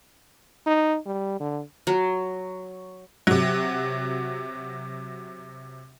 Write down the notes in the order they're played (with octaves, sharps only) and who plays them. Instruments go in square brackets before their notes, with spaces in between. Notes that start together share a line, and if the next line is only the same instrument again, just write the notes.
[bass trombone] D#4
G3
D3
[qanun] F#3
[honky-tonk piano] C3 F#3